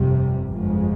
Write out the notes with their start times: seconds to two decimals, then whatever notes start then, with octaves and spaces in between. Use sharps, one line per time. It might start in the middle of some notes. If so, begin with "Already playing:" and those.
Already playing: G1 F2 C3 G3
0.49 G1 F2 C#3 F3 G#3